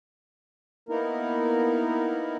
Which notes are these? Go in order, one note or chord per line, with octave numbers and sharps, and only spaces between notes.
A#3 B3 D#4 E4 A#4